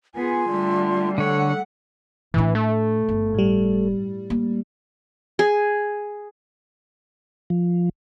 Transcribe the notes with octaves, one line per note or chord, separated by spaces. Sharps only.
B3 F4 G#4 G#5
D3 G3 A3
D3 A4 C#5 F#5
A2 E3 D4
A3
G1
A2 G3
A#3
G#4
F3